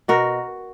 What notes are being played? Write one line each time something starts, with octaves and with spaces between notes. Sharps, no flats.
B2 F#4 A#4